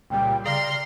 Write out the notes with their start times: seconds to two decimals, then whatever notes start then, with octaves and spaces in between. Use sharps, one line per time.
0.10 C#2 A#2 G3 G5
0.45 C#3 D5 A#5 C6 F6